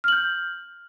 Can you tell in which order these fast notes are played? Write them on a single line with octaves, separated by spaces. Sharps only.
F6 F#7 G6